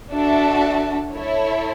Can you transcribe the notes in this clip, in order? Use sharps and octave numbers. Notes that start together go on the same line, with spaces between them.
D4 F#4 A4 E5 A5
E4 A4 C#5